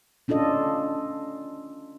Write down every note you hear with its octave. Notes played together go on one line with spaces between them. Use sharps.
C#4 D4 F4 A4 D#5